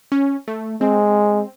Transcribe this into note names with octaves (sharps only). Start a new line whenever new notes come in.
C#4
A3
G#3 C4